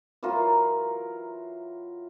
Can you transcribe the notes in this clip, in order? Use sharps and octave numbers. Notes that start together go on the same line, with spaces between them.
E3 F#3 F4 A#4